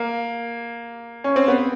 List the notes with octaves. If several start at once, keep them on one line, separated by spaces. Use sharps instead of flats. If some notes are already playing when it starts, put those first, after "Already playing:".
Already playing: A#3
C#4
C4
B3